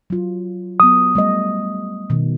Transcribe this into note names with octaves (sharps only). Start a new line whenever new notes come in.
F#3 F4
F#3 B3 D#6
G3 A3 D#5
B2 D#3